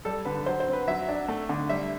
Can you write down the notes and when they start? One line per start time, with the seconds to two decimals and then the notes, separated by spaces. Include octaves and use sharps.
0.05 G3 A4
0.25 D3 B4
0.46 F#3 C5
0.60 C5
0.67 C4
0.73 B4
0.88 F#3 E5
1.09 D4
1.28 A3
1.49 D3
1.69 G3 E5